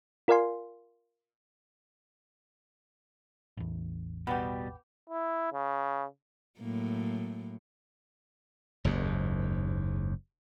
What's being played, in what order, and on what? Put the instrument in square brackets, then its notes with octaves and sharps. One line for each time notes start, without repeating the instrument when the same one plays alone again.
[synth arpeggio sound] F4 A#4 D5 F5 G#5 C6
[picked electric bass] A1 E2
[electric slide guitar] B2 G3 [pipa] B3 G4
[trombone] E4
C#3
[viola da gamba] A2 F#3 A#3
[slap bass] F#1 D#2 G#2